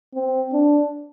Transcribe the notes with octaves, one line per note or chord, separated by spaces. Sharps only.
C4
D4